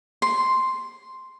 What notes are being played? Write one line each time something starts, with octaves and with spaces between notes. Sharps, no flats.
C6